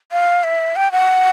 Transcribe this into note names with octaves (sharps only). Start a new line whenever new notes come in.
F5
E5
G5
F#5